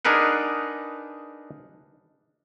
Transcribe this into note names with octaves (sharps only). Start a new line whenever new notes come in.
D4 D#4 G#4 A#4 B4 F#5